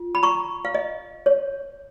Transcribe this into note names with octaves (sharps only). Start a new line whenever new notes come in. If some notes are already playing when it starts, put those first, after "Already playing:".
Already playing: F4
B5
A#5 C#6
F5
D#5
C#5